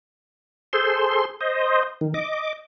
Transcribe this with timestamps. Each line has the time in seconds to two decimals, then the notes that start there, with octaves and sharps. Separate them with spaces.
0.73 G#4 A4 C5 C6
1.41 C5 D#5
2.01 D#3
2.14 D#5 D6